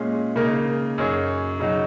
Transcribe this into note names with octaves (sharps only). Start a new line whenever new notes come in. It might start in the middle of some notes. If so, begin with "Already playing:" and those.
Already playing: A#2 G#3 C#4 G#4
C#3 A#3 D#4 A#4 D#5
F#2 F#3 D#4 G#4 C#5
C#3 F#3 D#4 F#4